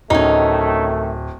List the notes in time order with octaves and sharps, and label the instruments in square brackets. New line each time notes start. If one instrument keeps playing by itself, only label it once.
[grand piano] D1 [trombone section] D#3 A3 [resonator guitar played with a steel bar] C#4 D#4